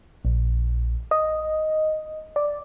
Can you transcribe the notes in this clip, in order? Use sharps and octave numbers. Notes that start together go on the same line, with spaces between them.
A#1
D#5
D5